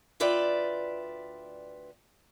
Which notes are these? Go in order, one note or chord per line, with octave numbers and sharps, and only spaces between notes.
D2 F4 B4 D5 E5 G5